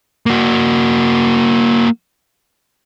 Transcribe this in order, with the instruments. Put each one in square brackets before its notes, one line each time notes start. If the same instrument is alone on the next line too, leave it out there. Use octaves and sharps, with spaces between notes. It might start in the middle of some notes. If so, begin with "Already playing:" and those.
[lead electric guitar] A#3 F#4